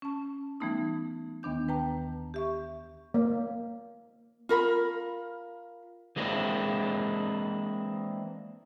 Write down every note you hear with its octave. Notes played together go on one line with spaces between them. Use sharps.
C#4 A5
E3 G3 A3 B3 D#4
D#2 D#3 B3 D4 G6
B4 G5 A5 A#5
G4 E5 C#6
A#3
F4 A#4 B5
E3 G#3 A#3 C4 D4 E4